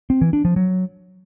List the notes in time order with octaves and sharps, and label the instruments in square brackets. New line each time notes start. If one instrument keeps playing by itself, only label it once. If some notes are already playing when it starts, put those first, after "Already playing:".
[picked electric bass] C4
E3
D4
F3
F#3